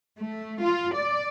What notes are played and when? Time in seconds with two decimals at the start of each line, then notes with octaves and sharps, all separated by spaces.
0.18 A3
0.63 F4
0.94 D5